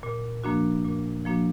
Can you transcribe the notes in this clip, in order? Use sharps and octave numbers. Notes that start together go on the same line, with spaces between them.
A#2
F3 A#3 D4 F#4
A#2
F3 A#3 D4 F#4